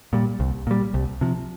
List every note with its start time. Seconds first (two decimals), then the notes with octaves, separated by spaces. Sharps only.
0.13 A#2 G3
0.40 C2
0.67 A#2 G3
0.94 C2
1.21 C3 F3